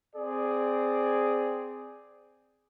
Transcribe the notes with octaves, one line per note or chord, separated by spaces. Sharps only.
C4 G#4 D5